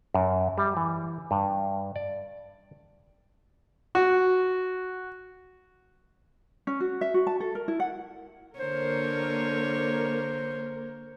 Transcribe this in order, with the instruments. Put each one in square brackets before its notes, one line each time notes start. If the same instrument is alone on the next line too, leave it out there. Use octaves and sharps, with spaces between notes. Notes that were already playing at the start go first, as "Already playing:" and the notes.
[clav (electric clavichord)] F#2
G3
E3
G2
D5
[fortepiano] F#4
[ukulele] C#4
F#4
E5
F#4
A5
A4
A#4
E4
F#5
[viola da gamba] D3 C#5 [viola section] A#3 A#4 [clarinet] C5